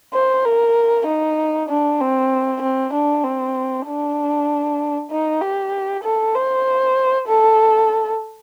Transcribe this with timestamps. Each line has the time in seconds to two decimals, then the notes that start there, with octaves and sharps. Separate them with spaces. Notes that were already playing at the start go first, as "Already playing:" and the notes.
0.14 C5
0.45 A#4
1.07 D#4
1.69 D4
2.00 C4
2.62 C4
2.93 D4
3.24 C4
3.87 D4
5.10 D#4
5.41 G4
6.03 A4
6.35 C5
7.28 A4